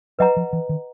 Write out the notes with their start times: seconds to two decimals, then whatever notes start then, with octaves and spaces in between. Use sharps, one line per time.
0.19 F#3 B4 D#5 F#5 A#5
0.37 F3
0.53 E3
0.69 D#3